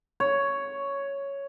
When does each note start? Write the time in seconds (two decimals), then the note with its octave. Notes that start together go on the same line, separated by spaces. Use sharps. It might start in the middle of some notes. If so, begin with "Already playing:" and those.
0.20 C#5